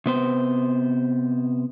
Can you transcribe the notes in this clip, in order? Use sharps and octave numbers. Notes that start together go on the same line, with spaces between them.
C3 B3 C5